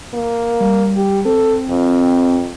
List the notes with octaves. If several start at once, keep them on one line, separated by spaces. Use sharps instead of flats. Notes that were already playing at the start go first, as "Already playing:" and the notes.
A#3
G3
G4
C4 A4
F2